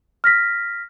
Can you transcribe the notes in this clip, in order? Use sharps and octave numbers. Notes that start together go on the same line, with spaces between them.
F6 A#6 B6